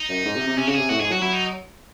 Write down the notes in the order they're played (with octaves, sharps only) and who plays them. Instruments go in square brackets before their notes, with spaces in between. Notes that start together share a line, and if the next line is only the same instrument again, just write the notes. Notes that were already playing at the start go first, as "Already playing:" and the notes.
Already playing: [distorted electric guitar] D#4
[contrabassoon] F#2
G#2
C3
C3
[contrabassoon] C3 [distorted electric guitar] C#4
[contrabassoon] C#3 [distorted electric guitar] F#4
[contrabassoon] C3 [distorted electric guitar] G#4
[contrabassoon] A2 [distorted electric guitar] F#4
[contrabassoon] G#2 [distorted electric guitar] G#4
[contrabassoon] F#3 [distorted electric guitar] F#4
[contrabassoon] F#3 [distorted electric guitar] E4
[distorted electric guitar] D#4